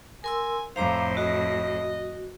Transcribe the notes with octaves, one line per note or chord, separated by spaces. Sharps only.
A#4 G#5 C6 E6
F2 A2 C5 F5 A#5 D6
F#4 D#5